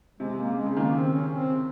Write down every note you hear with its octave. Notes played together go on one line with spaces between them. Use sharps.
C3 G#3
A#3
C#3
G#3
C#3
D#3 A#3
C4
C#4
C4